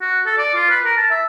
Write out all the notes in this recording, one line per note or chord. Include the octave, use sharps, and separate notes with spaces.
F#4
A4
D5
F4
B4
A#4
A5
E5